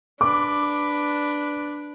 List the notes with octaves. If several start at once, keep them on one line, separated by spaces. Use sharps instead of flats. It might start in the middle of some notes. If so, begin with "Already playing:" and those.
D4 B4 D6